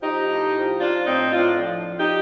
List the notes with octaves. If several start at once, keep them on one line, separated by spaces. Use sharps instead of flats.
F3 D#4 G4
A2
F3
F3 D4 F4
A2 C4 D#4
A2 D4 F4
F3
F3
D#4 G4